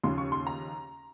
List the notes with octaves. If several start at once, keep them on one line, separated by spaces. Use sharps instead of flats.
D#2 C#3 F3 C6
C#6
C6
A#5